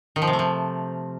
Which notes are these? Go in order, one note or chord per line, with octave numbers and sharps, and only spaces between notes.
D#3
F3
C3
A3
F3